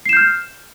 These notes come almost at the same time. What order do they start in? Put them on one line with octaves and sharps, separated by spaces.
C7 E7 G6 F6